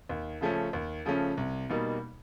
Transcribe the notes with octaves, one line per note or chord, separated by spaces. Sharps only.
D#2
C#3 F3 A3 C#4
D#2
C#3 F3 A3 C#4
C2
B2 G3 A#3 D#4